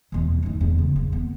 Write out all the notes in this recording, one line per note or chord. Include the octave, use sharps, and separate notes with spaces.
E2 B2
A2 D#4
E2
C#3
A#3
B3